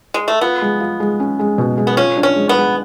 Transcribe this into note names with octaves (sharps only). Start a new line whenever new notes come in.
G#3
A3
B3 F4
G#3
F4
G#3
C#4
G#3
B2
G#3
B3
C#4 F4
D4
C#4
G#3
B3
G#3